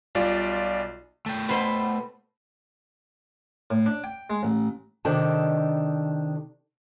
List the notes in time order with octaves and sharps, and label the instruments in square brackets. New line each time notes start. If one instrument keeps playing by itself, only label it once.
[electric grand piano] B1 G3 F4 D5
[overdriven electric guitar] A3 G5
[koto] B2 [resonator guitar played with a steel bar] B4 C5
[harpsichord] A2
D4
G5
G#3
A1
[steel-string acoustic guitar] C3 D#3 D4 D#4 A4 A5